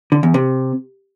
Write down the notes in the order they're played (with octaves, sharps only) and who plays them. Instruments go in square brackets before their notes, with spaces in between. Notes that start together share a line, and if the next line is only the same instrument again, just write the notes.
[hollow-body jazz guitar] D3
E2
C3